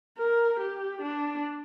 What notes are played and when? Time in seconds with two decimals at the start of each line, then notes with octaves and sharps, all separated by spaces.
0.18 A#4
0.60 G4
1.02 D4